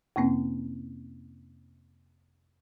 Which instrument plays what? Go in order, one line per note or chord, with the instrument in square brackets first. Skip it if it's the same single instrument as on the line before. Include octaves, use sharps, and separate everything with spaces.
[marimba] F2 C3 A#3 C4 C#4